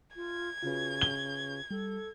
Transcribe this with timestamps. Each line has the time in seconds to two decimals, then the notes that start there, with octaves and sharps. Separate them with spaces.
0.16 F4 G#6
0.63 C#3 F4 F#4 B4
1.01 G7
1.71 G3 A4